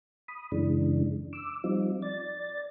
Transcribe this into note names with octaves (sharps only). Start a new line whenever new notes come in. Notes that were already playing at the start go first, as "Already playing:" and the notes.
B5 D#6
F#2 C#3 E3 G#3 D4
D6 E6
F3 G3 C4 D#4 F4
D5 A6